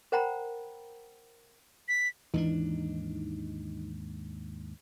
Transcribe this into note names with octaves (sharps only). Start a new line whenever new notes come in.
A#4 C5 F#5 G5 A#5 B5
B6
D#2 G#2 E3 D4 D#4